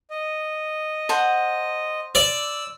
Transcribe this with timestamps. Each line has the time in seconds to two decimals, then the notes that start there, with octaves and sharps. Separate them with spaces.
0.10 D#5
1.09 C5 F#5 A5
2.15 D5 E6